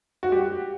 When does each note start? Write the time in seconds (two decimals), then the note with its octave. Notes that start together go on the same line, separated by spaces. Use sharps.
0.23 F#4
0.32 G3 G4